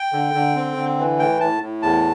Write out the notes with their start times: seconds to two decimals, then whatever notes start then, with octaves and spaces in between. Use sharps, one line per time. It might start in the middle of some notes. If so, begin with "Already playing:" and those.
Already playing: G5
0.13 D3
0.34 D3
0.56 C4
0.76 D3
0.98 E3
1.19 A2 G5
1.40 A2 A5
1.61 A2
1.82 E2 A5